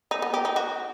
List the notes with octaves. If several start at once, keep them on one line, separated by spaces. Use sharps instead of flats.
D#4
B3
G4
D#4
F#4